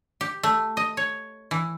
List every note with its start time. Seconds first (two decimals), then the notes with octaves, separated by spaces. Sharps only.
0.21 G4
0.43 A3
0.77 D#5
0.97 C#5
1.51 E3